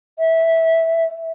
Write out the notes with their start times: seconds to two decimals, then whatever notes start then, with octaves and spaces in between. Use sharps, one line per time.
0.19 E5